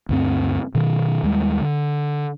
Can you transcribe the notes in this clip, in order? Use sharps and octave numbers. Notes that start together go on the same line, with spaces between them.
D2 G2 C4
B2 D#3
D#2 G3 G#3
D3